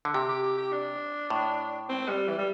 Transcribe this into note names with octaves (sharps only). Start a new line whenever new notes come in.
D3
C3 G4
G4
G4
G4
D4
A2
C4
G3
E3
G3